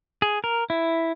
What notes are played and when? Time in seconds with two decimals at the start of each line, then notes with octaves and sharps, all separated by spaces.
0.22 G#4
0.44 A#4
0.70 E4